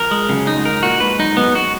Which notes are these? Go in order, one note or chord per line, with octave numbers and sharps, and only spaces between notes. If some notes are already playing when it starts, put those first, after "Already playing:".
Already playing: F2 F3 A#4
G#3
F#2 C#3 F#3
D#4
G#2 G#3
A#4
A#2 A#3 F#4
G#2 G#3 B4
F#2 F#3 D#4
G#3
F#2 F#3 B3
F#4